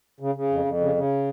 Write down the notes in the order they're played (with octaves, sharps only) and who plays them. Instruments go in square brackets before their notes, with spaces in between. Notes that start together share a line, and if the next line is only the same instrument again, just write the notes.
[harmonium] C#3
C#3
F2
F2
C#3
C#3